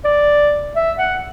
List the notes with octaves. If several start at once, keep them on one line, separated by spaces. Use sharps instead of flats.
D5
E5
F#5